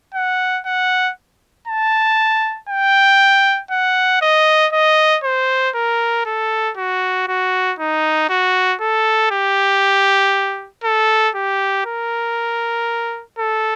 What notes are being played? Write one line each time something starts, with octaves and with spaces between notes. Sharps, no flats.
F#5
F#5
A5
G5
F#5
D#5
D#5
C5
A#4
A4
F#4
F#4
D#4
F#4
A4
G4
A4
G4
A#4
A4